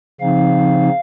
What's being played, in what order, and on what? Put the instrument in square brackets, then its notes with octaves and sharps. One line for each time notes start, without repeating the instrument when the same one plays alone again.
[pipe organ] C#3 F3 C4 D#4 F5